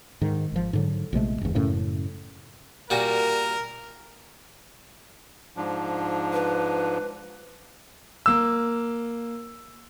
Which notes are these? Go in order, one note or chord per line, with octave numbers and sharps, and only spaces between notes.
G#2 D#3
G#1 F3
G#2 D3 F#3
A#1 C3 G#3 A3
F#1 E2
F#2 A2 C#3
A#2 G3 F#4 A#4
G#2 F3 D4
B4
A#3 E6